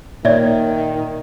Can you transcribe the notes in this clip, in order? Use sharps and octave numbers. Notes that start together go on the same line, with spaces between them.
A#2 D#3 C#5 D5 E5